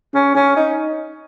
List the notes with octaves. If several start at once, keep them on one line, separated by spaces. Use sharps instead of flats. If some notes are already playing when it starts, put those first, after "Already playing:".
C#4
C#4
D#4